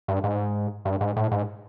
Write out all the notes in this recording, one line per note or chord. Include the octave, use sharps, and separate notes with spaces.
G2
G#2
G2
G#2
A2
G#2